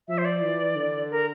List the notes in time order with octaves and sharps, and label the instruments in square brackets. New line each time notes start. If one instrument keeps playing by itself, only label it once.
[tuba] F3 [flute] E5
[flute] C5
D5
[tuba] E3
D3
[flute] A#4